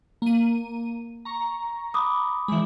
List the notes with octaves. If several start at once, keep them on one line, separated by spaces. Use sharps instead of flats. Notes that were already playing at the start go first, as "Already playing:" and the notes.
A#3 D#7
A#5 C#6
B5 D6 D#6
E3 G#3